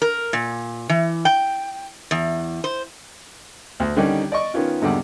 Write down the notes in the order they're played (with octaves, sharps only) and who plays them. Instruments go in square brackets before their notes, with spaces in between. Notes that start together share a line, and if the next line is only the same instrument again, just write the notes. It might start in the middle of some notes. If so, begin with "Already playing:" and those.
[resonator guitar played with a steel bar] A#4
A#2
E3
G5
E2
C5
[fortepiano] D2
D3 D#3 G3 C#4 D#4
D5 D#5 C#6
D#3 B3 C#4 F4
G#1 E2 D3 G3 F#5